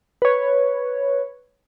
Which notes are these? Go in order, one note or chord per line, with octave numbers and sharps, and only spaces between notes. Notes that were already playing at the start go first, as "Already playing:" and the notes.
B4 C#5